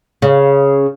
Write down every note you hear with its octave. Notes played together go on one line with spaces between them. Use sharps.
C#3